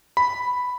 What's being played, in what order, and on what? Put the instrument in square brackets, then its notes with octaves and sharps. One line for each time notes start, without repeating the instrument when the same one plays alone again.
[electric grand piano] B5